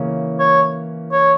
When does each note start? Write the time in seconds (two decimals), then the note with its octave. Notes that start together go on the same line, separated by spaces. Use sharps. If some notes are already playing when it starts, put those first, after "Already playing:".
Already playing: C#3 E3 A#3 C#4
0.40 C#5
1.12 C#5